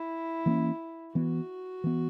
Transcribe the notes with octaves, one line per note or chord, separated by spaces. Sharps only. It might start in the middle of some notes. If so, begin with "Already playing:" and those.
Already playing: E4
E3 A#3 C#4
E3 B3 F#4
E3 B3